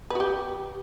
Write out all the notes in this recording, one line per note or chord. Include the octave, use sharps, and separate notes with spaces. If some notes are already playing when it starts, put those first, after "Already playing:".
F#4 G4 B4